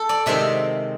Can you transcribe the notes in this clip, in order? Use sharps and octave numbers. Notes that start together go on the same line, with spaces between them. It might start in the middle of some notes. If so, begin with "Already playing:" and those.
Already playing: A4
D5
C3 D#3 G#3 C4 E5